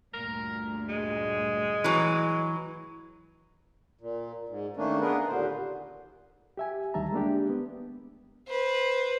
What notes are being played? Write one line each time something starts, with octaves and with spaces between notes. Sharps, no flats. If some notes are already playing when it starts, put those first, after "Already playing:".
D2 G2 A#2 A#4
G#3
E3 F#3
A#2
G#2
D#3 A3 A#3 C#4 D4
A#3 B3 D4 G#4 A#4 B4
D#2 A#2 D3 C5
G4 E5 G#5
D2 D#3 G3 E5 A5 A#5
G#3 A#3 D4 G4
B3
B4 C5